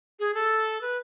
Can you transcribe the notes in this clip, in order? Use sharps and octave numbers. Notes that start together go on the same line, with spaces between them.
G#4
A4
B4